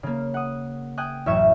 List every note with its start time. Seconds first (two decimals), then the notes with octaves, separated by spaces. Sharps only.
0.03 C#3 A#3
0.34 F#5 D#6
0.98 G5 G#5 D#6 F#6
1.26 A1 F#2 E5 C#6 G#6 E7